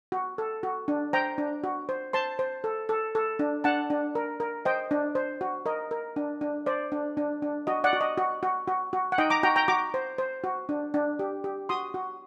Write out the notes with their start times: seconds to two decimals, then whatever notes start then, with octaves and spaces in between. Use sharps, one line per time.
0.12 F#4
0.38 A4
0.63 F#4
0.88 D4
1.13 C5 G5 A#5
1.38 D4
1.64 F#4
1.89 C5
2.13 C5 A5 C6
2.39 C5
2.64 A4
2.89 A4
3.15 A4
3.39 D4
3.64 D4 F#5 A5
3.90 D4
4.15 A#4
4.40 A#4
4.65 C5 D#5 G5
4.91 D4
5.15 C5
5.41 F#4
5.66 A#4 D#5
5.91 A#4
6.16 D4
6.41 D4
6.66 C5 D5
6.92 D4
7.17 D4
7.42 D4
7.67 F#4 D#5
7.84 D5 F#5
7.93 F#4
8.01 D#5
8.18 F#4
8.43 F#4
8.68 F#4
8.93 F#4
9.12 F#5
9.18 D#4 D#5 G5
9.30 A#5 D6
9.43 F#4 G5 A#5
9.56 G5 A#5
9.68 F#4 A#5 D6
9.94 C5
10.18 C5
10.44 F#4
10.69 D4
10.94 D4
11.19 G4
11.44 G4
11.69 F#4 C6 D#6
11.94 F#4